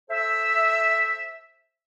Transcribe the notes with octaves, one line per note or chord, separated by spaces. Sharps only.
A4 C5 E5